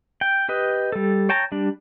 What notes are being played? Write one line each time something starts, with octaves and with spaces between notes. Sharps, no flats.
G5
G4 B4 D#5
G3 A4
C#5 G5 A5 A#5
G3 D4